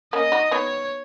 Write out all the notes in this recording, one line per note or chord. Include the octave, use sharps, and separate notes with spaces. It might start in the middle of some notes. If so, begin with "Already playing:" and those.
A#3 C#4 D#5
D#4 F#4
B3 D#4 C#5